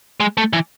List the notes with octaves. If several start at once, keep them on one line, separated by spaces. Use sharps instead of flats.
G#3
A3
E3